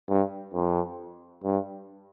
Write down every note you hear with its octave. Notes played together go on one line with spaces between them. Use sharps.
G2
F2
G2